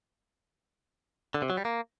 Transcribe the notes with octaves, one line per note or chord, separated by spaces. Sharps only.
D3
C3
F#3
G3
A#3